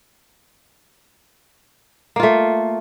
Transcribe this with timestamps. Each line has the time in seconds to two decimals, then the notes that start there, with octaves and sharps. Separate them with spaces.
2.16 A#3
2.20 F4
2.23 A3